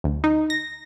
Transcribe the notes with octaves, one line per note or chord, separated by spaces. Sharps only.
D2
D#4
A#6